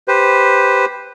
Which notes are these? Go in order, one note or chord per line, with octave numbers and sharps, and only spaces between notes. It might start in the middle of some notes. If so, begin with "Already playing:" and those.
G4 B4 C5